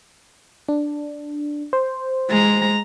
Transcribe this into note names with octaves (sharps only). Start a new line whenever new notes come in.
D4
C5
G#3 A#5